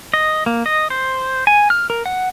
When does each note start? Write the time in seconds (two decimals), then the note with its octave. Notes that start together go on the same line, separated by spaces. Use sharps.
0.14 D#5
0.46 A#3
0.66 D#5
0.90 C5
1.47 G#5
1.70 F6
1.90 A#4
2.06 F#5